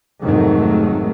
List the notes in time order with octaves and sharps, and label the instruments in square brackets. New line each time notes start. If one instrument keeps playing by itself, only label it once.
[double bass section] F1 G#2 D#3 F#3 A3